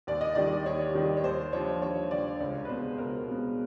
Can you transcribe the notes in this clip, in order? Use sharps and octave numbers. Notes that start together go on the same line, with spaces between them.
D#2 D5
D#5
D#3 G3 D5
D#2 C#5
D#3 G3
C#5
D#2 C5
D3 F3 C#5
D#2 C#5
D3 F3 D5
C#2 C#5
B4
B2 G#3 B3 C5
C#2 A#4
B2 G#3 B3